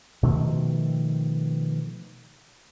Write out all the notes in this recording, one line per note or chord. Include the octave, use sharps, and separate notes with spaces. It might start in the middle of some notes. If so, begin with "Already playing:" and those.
B2 D#3 F3 A3